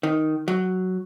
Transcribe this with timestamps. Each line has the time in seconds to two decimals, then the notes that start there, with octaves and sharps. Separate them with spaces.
0.03 D#3
0.48 F#3